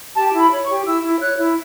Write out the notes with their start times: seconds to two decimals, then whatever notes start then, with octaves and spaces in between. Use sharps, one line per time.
0.16 G4 A5
0.34 E4
0.39 B5
0.51 C#5
0.63 C#6
0.69 G4
0.86 E4 E6
1.03 E4
1.20 C#5 F#6
1.38 E4